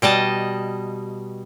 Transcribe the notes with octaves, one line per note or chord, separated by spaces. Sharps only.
B2 G3 D#5 A5